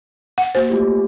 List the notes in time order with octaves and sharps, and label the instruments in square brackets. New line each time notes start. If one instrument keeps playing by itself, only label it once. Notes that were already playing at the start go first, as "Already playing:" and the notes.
[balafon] F#5
[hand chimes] A#3 F#4 G#5 [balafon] C5
[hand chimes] A3 F4 G4